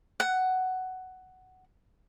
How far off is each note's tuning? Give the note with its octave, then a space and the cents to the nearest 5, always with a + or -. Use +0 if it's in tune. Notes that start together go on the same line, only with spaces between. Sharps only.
F#5 +10